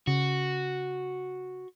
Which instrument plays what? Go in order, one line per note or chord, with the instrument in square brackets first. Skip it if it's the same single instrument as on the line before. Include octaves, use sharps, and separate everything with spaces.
[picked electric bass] C#3 [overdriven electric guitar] F#4